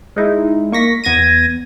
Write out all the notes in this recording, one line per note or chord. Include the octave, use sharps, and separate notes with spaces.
G#3 D#4 E4
A#3 C#6 A#6 B6
E2 B3 G#6 A#6 D#7